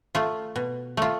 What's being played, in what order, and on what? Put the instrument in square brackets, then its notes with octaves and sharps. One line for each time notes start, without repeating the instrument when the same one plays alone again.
[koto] A3 F4
B2
A3 F4